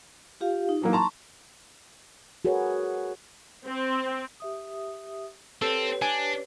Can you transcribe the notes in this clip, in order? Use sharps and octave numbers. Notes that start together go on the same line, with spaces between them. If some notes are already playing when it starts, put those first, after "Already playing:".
F4 G4 F5
D#4
E3 F#3 A#3
A5 A#5 C6 C#6
F#4 G#4 A#4 B4 C#5
C4
G4 E5 D#6
C4 G4 A4 B4 C#5
D4 G#5